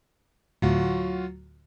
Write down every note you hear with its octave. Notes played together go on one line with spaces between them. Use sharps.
D2 A2 F#3 F4 F#4